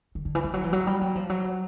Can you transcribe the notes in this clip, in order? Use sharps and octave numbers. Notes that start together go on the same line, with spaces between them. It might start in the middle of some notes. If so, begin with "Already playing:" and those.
D#3
D3
E3
F3
F#3
E3
F#3
G3
F#3
F3
F#3